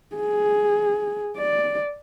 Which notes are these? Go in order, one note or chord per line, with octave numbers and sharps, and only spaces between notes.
G#4
D5